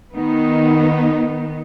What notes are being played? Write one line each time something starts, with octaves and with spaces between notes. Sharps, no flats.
D#3 B3 D#4